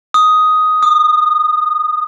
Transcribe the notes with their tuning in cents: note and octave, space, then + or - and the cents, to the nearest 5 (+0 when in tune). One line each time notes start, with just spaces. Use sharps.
D#6 +5
D#6 -25